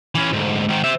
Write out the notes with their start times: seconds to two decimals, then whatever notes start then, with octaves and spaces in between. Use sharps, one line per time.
0.15 E3 C#4
0.33 D2 G#2
0.68 G#2 D#3
0.84 C5 E5